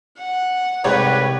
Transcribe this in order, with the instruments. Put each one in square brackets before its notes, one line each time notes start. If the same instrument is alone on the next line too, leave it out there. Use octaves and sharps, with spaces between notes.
[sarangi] F#5
[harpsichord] C2 G#2 C3 [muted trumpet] B4 [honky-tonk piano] C#5 D5 G5